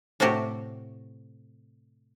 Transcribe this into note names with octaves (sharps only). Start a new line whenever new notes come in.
A2 C3 A3 F#4 G4